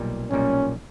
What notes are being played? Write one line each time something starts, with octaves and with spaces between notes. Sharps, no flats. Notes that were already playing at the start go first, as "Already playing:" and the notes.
Already playing: B1 A#2 G3
B1 A#2 G3 C#4